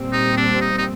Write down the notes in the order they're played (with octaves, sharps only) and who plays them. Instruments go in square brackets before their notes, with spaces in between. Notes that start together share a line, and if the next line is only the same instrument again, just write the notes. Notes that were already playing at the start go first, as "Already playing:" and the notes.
Already playing: [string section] A#2 G3 C4
[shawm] D#4
D4
D#4
D#4